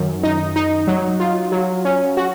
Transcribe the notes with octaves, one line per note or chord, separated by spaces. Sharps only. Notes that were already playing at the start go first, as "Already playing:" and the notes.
Already playing: F#2 D#3
D#4
D#4
F#3
F4
F#3
C#4
F#4